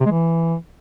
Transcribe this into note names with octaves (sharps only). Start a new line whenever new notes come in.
C3
G#3
E3